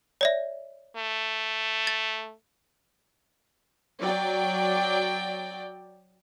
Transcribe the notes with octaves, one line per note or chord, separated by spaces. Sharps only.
C#5 D5 E5
A3
A6
F#3 D5 G5